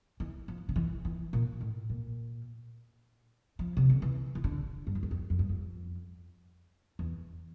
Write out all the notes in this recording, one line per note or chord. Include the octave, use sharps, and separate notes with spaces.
E3
F3
D3
E3
E3
A#2
A2
A#2
F3
C3
D3
E3
E3
D3
G2
F2
E2
F2
F2
G2
F2
E2